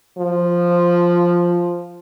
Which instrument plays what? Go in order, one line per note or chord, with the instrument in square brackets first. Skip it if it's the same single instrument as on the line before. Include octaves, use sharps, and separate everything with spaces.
[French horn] F3